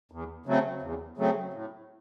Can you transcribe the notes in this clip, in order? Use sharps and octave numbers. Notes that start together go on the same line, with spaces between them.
E2
C#3 F#3 A3 C4
E2
C#3 F#3 A3 C4
A2